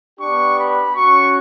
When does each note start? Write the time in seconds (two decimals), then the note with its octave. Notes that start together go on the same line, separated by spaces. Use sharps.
0.20 B3 D4 G4 C#6
0.58 B5
0.96 C#4 F#4 C#6